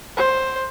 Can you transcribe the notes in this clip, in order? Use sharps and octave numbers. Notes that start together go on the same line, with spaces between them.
C5